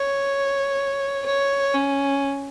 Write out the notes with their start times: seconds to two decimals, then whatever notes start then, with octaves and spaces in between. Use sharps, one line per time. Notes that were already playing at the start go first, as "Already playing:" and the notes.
Already playing: C#5
1.26 C#5
1.74 C#4